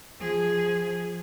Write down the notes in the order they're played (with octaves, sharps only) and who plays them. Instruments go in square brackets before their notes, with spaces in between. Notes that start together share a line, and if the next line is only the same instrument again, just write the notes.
[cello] F3 G#4